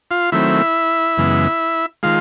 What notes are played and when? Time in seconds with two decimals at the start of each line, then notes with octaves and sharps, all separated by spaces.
0.11 F4 F5
0.32 D#3 F#3 A3 C4 E4 E5
1.18 F#2 C#3 E3 G#3 B3
2.03 D#3 G#3 F4 F5